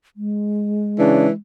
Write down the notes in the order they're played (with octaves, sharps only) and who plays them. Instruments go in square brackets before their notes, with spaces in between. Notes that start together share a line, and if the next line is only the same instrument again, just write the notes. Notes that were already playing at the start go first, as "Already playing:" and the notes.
[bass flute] G#3
[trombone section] C#3 C#4 D4 [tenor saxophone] E3